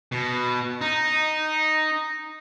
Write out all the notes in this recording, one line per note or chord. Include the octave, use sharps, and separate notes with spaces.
B2
D#4